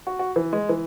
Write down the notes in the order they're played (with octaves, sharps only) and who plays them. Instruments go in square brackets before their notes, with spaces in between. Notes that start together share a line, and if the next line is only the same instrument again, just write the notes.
[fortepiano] F#4
F#4
E3
G#3
E3